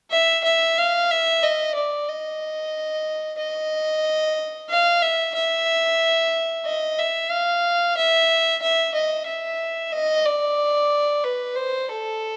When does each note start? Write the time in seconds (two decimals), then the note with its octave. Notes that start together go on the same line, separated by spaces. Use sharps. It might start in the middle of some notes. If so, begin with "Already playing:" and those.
0.11 E5
0.44 E5
0.78 F5
1.10 E5
1.42 D#5
1.75 D5
2.08 D#5
3.38 D#5
4.70 F5
5.02 E5
5.35 E5
6.66 D#5
6.99 E5
7.31 F5
7.97 E5
8.62 E5
8.95 D#5
9.27 E5
9.92 D#5
10.26 D5
11.24 B4
11.56 C5
11.88 A4